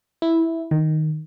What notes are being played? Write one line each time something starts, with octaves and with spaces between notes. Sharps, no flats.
E4
D#3